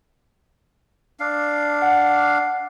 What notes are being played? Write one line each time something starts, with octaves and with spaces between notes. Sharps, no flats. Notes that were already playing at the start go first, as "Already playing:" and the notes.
D4 F5
F#5